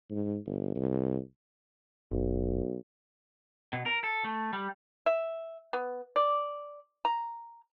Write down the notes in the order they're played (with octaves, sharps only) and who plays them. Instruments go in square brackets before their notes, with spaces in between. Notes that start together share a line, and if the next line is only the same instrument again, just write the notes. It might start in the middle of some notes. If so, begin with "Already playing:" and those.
[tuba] G#2
G1
C2
[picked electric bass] F#1 [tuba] B1
[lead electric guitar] B2
A#4
A4
A3
G3
[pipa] E5
B3
D5
A#5